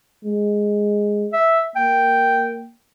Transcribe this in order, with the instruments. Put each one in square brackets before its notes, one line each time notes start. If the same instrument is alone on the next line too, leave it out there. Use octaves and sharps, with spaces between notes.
[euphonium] G#3
[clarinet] E5
[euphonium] A#3 [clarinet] G5